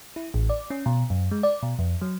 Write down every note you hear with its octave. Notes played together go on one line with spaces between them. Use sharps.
E4
A1
D5
C#4
B2
F#2
G#3
D5
B2
F2
F#3